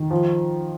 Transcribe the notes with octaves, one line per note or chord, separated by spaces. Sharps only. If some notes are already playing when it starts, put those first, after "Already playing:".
Already playing: D#3
F3